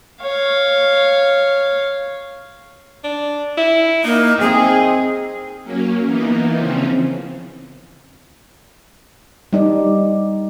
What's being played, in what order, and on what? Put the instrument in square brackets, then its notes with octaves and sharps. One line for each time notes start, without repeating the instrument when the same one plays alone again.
[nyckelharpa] C#5 F5
[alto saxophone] D4
E4
[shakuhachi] A#3 [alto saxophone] D#4
[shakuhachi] C4 [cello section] G#4
[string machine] F#3 A#3 C#4
E3 A#3 B3 D#4
C#3 E3 F3 C4 C#4
[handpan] G3 D#4 D5